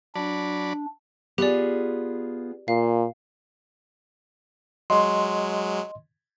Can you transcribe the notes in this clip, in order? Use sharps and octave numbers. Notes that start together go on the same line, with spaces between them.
F#3 D4 D5 B5
B3 F4 G4 G#4 D5
A#2 F5
F#3 G#3 D#5 C6